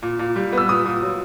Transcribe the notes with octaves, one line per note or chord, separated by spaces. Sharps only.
A#2
A#2
G3
B3 E6
A#2 D#6
A#2
F#3